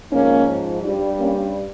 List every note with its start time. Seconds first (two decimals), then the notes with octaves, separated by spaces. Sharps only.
0.11 G#2 F3 A#3 C#4
0.83 G2 G3
1.18 A#3 C#4